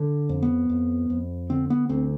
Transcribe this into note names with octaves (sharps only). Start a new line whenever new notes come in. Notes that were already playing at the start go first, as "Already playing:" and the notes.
Already playing: D3
F2
B3
F2
F2
D3 C4
B3
D2 C4